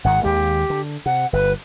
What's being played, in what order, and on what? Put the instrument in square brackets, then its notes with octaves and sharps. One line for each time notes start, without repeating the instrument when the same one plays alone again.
[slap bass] G#1 G#2 D#3 [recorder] F#5
[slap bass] D#2 G#3 [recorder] G4
[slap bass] D3
[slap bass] C3 [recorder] F#5
[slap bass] G1 [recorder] B4